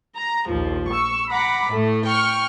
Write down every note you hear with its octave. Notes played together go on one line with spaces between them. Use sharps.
A#5
A#1 D#2 F3
C#6 E6
F#5 A#5 B5 D6
A2 A3
G5 C#6 F6